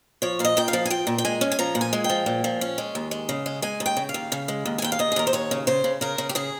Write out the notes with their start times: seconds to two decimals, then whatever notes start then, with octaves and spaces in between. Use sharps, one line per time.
0.22 F3 C#5
0.39 A#2 F5
0.45 D#5
0.57 A#2 G5
0.68 F5
0.73 F3
0.86 G#5
0.90 F3 G5
1.07 A#2
1.18 G5
1.25 G#3 G#5
1.41 C#4
1.52 G#5
1.59 F3 A#5
1.75 A#2
1.81 G#5
1.93 G#3
2.04 G5
2.09 F3
2.26 A#2
2.44 F3
2.61 C#4
2.78 G#3
2.95 D#2
3.11 G#3
3.29 C#3
3.46 G#3
3.62 G#3 G#5
3.80 D#2
3.86 G5
3.97 C#3
4.09 F5
4.14 D#2
4.32 C#3
4.48 G#3
4.66 D#2
4.78 G#5
4.82 D#2 G5
4.92 F5
4.99 D#2 D#5
5.12 G#4
5.16 D#2 A#4
5.27 C5
5.33 D#2 C#5
5.51 C#3
5.67 C#3 C5
5.84 C#3
6.01 C#3 A#4
6.18 C#3
6.29 G4
6.35 C#3 G#4